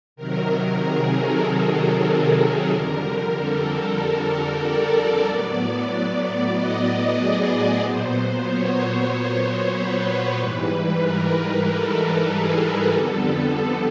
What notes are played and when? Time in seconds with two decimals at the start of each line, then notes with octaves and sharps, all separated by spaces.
0.16 C3 D#3 F#3 A#4
0.80 G#4
1.11 A4
1.43 A#4
2.71 F2 D3 G3
3.35 A4
3.67 A4
3.99 A4
4.30 A#4
4.63 D5
5.26 A2 F#3 B3
6.53 D#5
6.86 D5
7.17 G#4
7.81 A#2 F#3 B3 C5
8.45 C#5
9.40 C5
9.72 B4
10.36 G#2 E3 G3
11.00 A#4
11.64 A4
12.27 G#4
12.91 F2 D3 G3 B3 A4